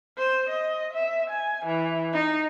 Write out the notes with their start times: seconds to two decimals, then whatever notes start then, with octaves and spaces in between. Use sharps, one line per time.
0.17 C5
0.50 D#5
0.93 E5
1.30 G#5
1.65 E3
2.13 D#4